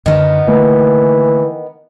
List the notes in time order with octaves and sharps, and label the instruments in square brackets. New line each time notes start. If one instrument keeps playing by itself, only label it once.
[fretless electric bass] F#2 D3 [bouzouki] D#3 B3
[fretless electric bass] D3 A3 A#3 [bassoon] E3